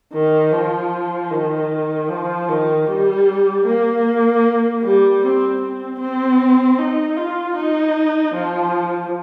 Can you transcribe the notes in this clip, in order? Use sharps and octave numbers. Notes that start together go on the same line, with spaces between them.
D#3
F3
D#3
F3
D#3
G3
A#3
G3
C4
C4
C4
D#4
F4
D#4
F3